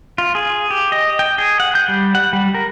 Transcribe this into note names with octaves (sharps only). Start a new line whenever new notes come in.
F4
G#4
G4
D#5
G5
G#4
F#5
G6
G3
F#5
G3
A#4